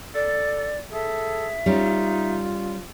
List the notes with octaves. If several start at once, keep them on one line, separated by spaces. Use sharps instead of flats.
A4 D5
G#4 A4 E5
G3 C#4 D#4 F4